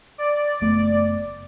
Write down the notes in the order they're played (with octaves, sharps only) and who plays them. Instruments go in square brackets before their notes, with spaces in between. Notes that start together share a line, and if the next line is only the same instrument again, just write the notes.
[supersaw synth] D5
[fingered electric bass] F#1 A3 B3